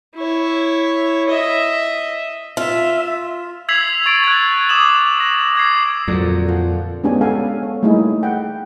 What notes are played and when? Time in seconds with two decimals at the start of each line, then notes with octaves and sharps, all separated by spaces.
0.15 E4 C#5
1.30 D#5 E5
2.57 F4 E5
3.69 E6 G#6 B6 C7 F7 F#7
4.06 C#6 A6 D7
4.24 F#6 G#6
4.69 D6 D#6 E7 F#7
5.20 A#6
5.55 E6 G#6 C7
6.08 F2 A#2 D3 F#3
6.46 F3 F#5
7.04 G#3 B3 C#4 D4 G4 G#5
7.21 A4 F5 F#5 G#5
7.63 C#5
7.83 G3 A3 A#3 D#4 E4 G#4
8.23 F#5 G5